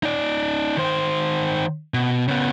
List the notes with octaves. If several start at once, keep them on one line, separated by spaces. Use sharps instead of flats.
D#4 D5
D#3 C5
B2
C#3 B3